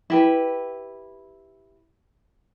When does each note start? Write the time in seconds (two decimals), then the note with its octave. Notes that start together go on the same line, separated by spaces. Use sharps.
0.10 E4 G4 B4